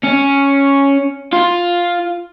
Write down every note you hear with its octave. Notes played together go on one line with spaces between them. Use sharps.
C#4
F4